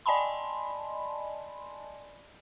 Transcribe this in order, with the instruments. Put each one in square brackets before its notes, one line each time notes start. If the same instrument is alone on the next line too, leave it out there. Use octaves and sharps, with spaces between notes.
[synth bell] D5 D#5 G#5 A5 B5 C6